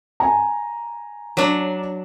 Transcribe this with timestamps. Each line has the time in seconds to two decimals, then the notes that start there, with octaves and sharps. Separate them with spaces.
0.20 G#5 A#5
1.37 F#3 D4